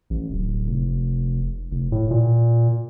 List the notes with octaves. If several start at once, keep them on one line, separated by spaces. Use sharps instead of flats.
A1
D1
F1
F1
A2
A#2